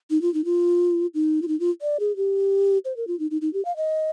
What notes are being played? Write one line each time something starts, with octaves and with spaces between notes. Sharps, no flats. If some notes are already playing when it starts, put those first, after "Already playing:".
D#4
F4
D#4
F4
D#4
F4
D#4
F4
D5
G#4
G4
C5
A#4
F4
D#4
D#4
D#4
G4
F5
D#5